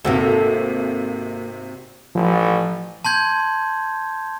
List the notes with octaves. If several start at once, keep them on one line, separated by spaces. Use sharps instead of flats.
G#1 C3 A#3 F#4 A4
A1 F3
A5 C6 G6 G#6